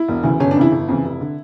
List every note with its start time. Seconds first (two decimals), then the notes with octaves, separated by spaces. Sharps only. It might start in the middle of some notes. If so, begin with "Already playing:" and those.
Already playing: E4
0.08 E1
0.24 D2 C#3 E3
0.40 G1 C#4
0.51 D4
0.56 F2 C#3 E3 E4
0.72 G1
0.88 F2 C#3 E3
1.05 F1
1.21 D3